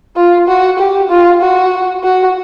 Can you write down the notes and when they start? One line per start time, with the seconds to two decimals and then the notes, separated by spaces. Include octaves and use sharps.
0.16 F4
0.48 F#4
0.79 G4
1.10 F4
1.42 F#4
2.04 F#4